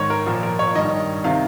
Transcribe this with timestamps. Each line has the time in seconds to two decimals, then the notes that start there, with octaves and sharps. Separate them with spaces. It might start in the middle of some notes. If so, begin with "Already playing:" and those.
Already playing: G#2 D#3 C#5
0.10 A#4
0.26 A#2 F3
0.43 A#4
0.59 C#5
0.75 G2 D#3 D#5
1.24 C3 D#3 F5